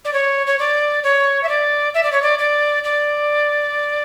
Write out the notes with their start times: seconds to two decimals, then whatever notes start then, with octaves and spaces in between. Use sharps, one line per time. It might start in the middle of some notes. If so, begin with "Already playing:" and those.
0.04 D5
0.13 C#5
0.46 C#5
0.58 D5
1.03 C#5
1.43 E5
1.48 D5
1.94 E5
2.03 D5
2.12 C#5
2.22 D5
2.38 D5
2.84 D5